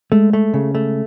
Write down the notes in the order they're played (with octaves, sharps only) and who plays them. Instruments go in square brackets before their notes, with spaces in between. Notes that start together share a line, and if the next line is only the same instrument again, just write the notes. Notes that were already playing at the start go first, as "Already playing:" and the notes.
[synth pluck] G#3 [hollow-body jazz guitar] A3
[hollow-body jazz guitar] A3
C#3
A3